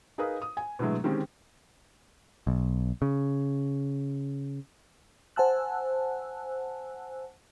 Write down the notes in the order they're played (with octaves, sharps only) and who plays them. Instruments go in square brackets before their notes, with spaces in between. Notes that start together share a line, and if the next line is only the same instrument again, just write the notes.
[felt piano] D#4 G#4 A#4 B4 F5 D#6
D#6
G#5
B2 D3 E3 F#3 G#3 A3
D3 D#3 G#3 C4 C#4 G4
[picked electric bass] B1
C#3
[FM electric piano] C5 F#5 G#5 A5 E6 F#6